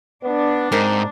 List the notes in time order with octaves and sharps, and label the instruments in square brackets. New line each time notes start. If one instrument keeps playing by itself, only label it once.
[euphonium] B3 [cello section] D4
[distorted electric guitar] G#2 [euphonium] C4 [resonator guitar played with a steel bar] D#4 A#4